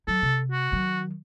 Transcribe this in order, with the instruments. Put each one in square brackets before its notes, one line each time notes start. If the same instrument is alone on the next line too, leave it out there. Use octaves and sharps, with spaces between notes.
[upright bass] F#3 [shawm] A4
[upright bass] C3
[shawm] F#4
[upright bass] D#3 F#3